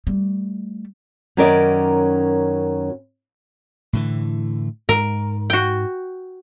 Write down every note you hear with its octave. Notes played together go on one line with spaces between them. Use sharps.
G3 A3
F#2 D#3 C#4 A#4 D5 D#5
A2 D3 E3
G#2 A#4
F#4 G5